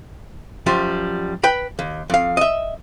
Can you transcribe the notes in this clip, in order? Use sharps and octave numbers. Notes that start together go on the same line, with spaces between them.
F#2 F3 G3
B4 G5 B5
D#2
F2 F5
D#5 E5